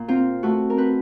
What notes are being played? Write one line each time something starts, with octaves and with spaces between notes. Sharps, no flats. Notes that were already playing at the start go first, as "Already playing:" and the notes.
Already playing: A#2
C4 F4
A3 F#4
A#4
C4 B4